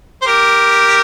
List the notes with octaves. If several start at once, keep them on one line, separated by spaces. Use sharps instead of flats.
C5
G4 A#4